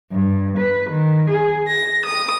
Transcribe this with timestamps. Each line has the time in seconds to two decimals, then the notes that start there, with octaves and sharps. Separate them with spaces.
0.11 G2
0.57 B4
0.89 D#3
1.29 G#4
1.67 A#6
2.06 D#6